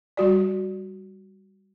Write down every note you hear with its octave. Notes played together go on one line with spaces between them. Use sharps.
G3 F#4 D5